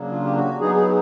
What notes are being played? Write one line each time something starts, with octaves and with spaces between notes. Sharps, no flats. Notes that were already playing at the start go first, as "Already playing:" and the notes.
Already playing: C#3 F#3 A#3 D4
F4
G4
F#4
F#3 B3 D#4 G#4
G#4